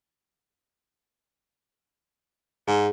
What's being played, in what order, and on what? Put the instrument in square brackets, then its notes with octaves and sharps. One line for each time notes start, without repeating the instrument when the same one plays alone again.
[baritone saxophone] G#2 [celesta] G#4